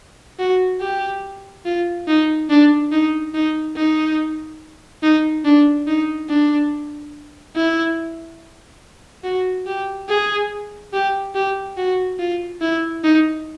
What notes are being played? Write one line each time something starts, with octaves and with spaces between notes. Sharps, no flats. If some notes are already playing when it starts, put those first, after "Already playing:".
F#4
G4
F4
D#4
D4
D#4
D#4
D#4
D#4
D4
D#4
D4
E4
F#4
G4
G#4
G4
G4
F#4
F4
E4
D#4